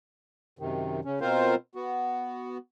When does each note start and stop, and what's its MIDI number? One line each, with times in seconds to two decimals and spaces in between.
0.59 1.00 42
0.59 1.00 48
0.59 1.00 51
1.05 1.19 49
1.05 1.19 61
1.21 1.55 47
1.21 1.55 60
1.21 1.55 65
1.21 1.55 70
1.21 1.55 72
1.21 1.55 77
1.75 2.58 59
1.75 2.58 66